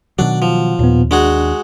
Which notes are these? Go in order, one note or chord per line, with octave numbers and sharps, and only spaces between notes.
B2 D#3 F#3 D4 F#5
F3
D#2 A#2 B3
G#3 D4 F#4 G#4